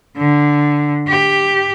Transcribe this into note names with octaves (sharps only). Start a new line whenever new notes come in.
D3
G4